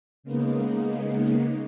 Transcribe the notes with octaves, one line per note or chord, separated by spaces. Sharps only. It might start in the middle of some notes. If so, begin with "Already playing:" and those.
C#3 G#3 A#3 B3 D#4